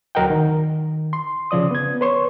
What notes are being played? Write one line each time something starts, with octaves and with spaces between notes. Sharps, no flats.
D2 F#3 A#4 D#5 F#5 G5
D#3
C6
C#3 F3 D5 D#6
B3 G#6
B4 C#5 C6 C#6